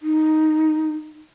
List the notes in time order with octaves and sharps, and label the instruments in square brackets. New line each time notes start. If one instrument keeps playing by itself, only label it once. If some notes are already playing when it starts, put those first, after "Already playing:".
[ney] D#4